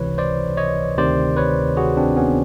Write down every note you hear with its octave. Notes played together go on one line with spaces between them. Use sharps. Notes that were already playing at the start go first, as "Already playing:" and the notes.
Already playing: C#2 C3 E3 B4 C#5
C5 D5
C#5 D#5
D2 C3 D#3 C5 D5
B4 C#5
F#4 G#4
C4 D4
B3 C#4